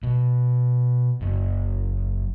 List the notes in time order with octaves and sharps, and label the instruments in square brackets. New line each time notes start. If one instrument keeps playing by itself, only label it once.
[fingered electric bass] B2
F#1